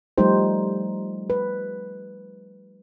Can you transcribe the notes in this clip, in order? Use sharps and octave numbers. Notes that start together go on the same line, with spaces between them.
F3 G3 A3 D#4 G4 C5
B4